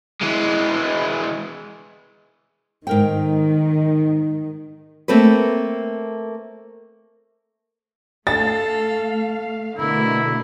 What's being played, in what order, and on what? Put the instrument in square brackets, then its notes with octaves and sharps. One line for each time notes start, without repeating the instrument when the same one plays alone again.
[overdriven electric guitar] E3 G#3
[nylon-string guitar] G#2 A#4 G5 [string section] D#3
[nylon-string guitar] A3 A#3 C4 A4 B4
[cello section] A3 F5 [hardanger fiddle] A4 [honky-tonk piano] A6
[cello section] B2 D3 A3 [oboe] E4 [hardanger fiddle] A#4